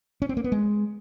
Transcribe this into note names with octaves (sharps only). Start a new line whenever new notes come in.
C#4
C4
A#3
B3
G#3